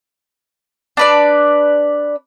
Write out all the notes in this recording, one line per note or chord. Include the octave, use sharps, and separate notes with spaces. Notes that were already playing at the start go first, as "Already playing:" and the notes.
D4 B4 D5